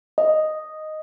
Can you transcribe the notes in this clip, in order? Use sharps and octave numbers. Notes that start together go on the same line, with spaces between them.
D#5